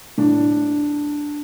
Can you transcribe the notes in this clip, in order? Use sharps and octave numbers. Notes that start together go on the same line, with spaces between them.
A2 D4